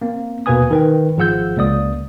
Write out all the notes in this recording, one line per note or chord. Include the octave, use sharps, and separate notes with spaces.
A#3 C4
D#2 B2 A#3 B4 G#5 D#6
D#3 B4 G5
G#1 F3 G#4 F#5 E6 G6
C#2 A#3 D5 D#6